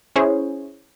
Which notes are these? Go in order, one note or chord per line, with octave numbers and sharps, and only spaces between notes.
C#4 E4 G#4 C5 C#5